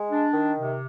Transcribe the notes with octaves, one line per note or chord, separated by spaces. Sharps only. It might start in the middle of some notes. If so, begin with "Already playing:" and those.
Already playing: G#3
D4
D#3
C3